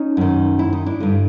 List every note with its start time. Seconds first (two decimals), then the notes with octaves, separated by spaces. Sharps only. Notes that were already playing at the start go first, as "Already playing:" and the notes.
Already playing: C#4 D#4
0.17 F#2 D#3
0.59 E4
0.73 D#4
0.86 D4 E4
1.00 G2 D3